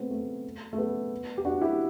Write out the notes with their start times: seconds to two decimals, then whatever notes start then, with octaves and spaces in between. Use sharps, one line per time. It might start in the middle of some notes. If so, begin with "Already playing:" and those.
Already playing: A3 B3 C4
0.10 A3
0.73 A3
0.78 B3
1.38 G4
1.45 D4 F#4
1.62 E4 G4